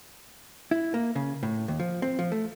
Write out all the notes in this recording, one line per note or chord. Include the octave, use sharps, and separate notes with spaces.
E4
A#3
C#3
A2
D#2
F3
C4
F3
A3